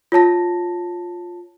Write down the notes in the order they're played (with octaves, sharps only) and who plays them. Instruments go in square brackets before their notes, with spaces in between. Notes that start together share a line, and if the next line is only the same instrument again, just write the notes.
[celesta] F4 C#5 A5 A#6